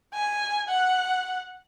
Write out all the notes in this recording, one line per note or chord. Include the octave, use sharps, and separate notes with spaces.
G#5
F#5